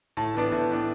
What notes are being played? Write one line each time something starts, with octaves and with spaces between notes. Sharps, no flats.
A2 A5
E3 B3 D4
A2
E3 B3 D4